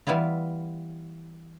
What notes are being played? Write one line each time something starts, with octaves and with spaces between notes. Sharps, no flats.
E3 G3 B3 E4 F4